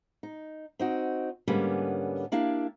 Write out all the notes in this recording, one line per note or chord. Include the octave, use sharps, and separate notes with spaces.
D#4
C4 D#4 F#4
G#2 D3 G3 A#3 B3 C#4
A#3 D4 E4 G4 F5